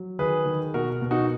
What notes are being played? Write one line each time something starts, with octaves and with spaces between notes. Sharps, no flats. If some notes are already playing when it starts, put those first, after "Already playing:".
Already playing: F#3
D#3 G#4 B4
D#3
B2 F#4 A#4
B2
D#4 F#4